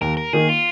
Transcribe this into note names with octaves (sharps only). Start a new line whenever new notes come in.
D#2 A#4
A#4
D#3 A#3 D#4 G#4
F4